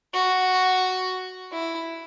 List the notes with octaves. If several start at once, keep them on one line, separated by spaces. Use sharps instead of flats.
F#4
E4